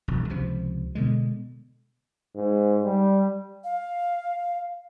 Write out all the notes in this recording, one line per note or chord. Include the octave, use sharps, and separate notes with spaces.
E1 A#1
C#2 C3 F3
B2 D3 G#3
G#2
G3
F5